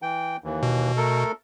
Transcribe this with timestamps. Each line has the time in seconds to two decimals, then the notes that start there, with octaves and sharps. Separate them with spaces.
0.02 E3 G5
0.44 D#2 E3
0.63 B2
0.97 A3 A4 A#4